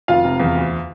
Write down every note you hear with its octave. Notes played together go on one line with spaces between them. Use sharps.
F1 F4 F5
C3
E2
D2